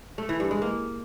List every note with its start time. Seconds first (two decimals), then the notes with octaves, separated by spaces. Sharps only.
0.18 A3
0.29 E3
0.40 G2
0.51 G#3
0.62 A#3